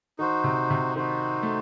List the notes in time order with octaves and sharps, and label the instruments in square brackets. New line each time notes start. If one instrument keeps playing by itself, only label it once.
[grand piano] D#3 [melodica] D#4 F#4 C5
[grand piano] C3
C3
[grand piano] D#3 [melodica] D#4 F#4 C5
[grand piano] A3